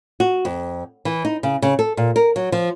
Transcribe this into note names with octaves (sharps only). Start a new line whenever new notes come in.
F#4
F2
E3
D#4
C#3
C#3
A4
A#2
A#4
F#3
F3